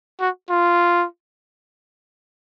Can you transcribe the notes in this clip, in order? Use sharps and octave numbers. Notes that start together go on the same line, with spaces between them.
F#4
F4